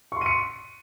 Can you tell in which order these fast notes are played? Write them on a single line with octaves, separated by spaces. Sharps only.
C#6 C6 D#7 C#7